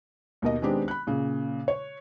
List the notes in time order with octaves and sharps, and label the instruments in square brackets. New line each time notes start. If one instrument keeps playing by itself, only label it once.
[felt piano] D#2 B2 A#4 D#5
D#3 G#3 B3 C4 D4 G4
B5 F#6
A#2 C#3
C#5